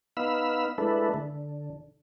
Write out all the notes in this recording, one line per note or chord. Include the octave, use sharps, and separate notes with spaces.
B3 D#4 F5 B5 E6
G#3 A3 D4 E4 A4 B4
D3